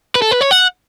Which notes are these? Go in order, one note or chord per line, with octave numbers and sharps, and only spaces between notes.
B4
A4
B4
C#5
F#5